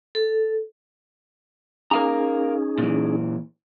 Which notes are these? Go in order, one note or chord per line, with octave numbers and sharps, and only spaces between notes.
A4
C#4 D#4 G#4 A#4 F5 A#5
A#2 E3